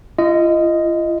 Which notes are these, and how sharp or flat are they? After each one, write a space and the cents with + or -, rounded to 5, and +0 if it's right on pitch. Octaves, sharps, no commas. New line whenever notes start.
F4 -40 D#5 +0